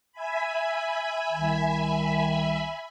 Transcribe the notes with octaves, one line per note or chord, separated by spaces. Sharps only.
E5 G#5 B5
C2 D#3